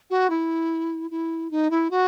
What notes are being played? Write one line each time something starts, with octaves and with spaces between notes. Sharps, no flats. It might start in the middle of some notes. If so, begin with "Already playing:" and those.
F#4
E4
E4
D#4
E4
F#4